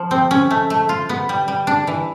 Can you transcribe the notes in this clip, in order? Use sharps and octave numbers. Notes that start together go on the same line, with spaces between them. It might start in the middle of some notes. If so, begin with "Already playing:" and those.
Already playing: F3
C4
C#4
A3
A3
F4
B3
G3
G3
D4
E3